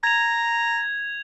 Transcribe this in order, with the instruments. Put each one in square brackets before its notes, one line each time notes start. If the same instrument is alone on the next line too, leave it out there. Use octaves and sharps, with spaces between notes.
[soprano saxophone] A#5 [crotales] G#6 F7